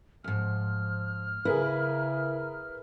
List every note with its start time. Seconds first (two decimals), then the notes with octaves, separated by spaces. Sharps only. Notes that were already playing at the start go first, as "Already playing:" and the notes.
0.24 D2 G#2 F3 F6
1.45 C#3 E4 G#4 A#4 B4